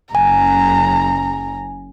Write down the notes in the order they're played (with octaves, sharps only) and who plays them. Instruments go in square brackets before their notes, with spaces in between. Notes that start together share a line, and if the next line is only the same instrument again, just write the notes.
[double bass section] F#1 [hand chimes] G#5 [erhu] A#5